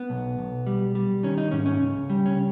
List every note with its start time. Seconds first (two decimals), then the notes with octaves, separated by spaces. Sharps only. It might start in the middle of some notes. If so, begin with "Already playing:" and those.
Already playing: B3
0.10 B1
0.39 B1
0.67 G3
0.95 G3
1.23 D#3 C#4
1.38 D#4
1.52 G#2 C#4
1.66 C#4
1.81 C#2
2.10 G3
2.26 C#4